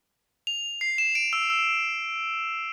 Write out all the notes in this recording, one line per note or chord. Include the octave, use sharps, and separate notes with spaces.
F7
C7
E7
D7
E6
E6